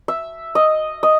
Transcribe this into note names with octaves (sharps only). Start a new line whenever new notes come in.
E5
D#5
D#5